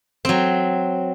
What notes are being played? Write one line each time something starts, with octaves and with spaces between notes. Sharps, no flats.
F#3 C4